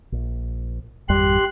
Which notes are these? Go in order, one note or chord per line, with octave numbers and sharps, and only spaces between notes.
A#1
G#1 F2 G3 G4 C6 F#6